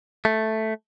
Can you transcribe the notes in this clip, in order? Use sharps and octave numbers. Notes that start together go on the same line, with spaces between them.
A3